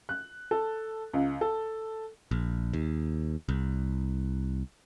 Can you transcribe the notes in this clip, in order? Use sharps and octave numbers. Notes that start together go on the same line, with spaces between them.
F#6
A4
C#2
A4
A#1
D#2
C2